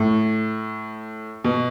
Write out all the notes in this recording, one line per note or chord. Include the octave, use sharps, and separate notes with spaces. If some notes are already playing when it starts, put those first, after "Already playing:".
Already playing: A2
B2